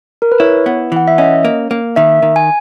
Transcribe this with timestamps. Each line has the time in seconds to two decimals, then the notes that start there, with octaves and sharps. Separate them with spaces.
0.22 A#4
0.32 B4
0.40 E4 C#5
0.66 B3
0.92 E3 F#5
1.08 E5
1.18 C#4 D#5
1.45 A#3
1.71 A#3
1.96 D#3 E5
2.23 D#3
2.36 G#5